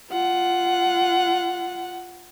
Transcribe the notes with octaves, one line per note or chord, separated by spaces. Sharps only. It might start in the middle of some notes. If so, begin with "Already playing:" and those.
F4 F#5